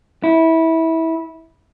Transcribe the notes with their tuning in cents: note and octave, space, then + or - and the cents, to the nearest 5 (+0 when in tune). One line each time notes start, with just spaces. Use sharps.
E4 -20